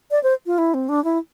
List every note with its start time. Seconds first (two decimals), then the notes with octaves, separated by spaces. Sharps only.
0.11 D5
0.23 C5
0.46 F4
0.58 E4
0.74 C4
0.89 D4
1.04 E4